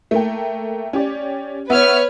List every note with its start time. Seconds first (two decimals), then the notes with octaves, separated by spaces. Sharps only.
0.11 A3 A#3 G5
0.93 C#4 G4 D5
1.70 B3 B4 C#5 E5 F6